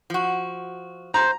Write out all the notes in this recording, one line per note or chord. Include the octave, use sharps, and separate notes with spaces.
F3 F#4
C5 A#5